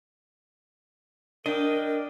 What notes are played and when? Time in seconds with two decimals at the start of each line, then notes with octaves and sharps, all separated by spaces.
1.46 D4 A#4 D#5 G5